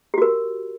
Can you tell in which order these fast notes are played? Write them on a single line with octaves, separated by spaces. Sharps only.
G4 F#4 A#4